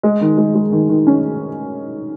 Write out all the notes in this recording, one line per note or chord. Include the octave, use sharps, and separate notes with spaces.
G#3
D#3
G#3
G#3
D#3
D#3
C#4